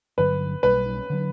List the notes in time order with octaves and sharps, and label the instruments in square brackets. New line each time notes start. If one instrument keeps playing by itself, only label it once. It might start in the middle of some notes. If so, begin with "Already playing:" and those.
[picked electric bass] G1 G2 D3 F#3 [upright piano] B4
[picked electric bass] B1 B2 G3 [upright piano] B4
[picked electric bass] D3 F#3